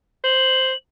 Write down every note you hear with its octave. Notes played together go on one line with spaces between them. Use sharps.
C5 F#7